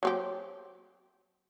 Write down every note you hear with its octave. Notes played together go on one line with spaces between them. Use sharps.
F#3 C4 G4